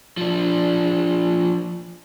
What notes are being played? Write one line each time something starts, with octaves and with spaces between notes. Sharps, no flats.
F3 D4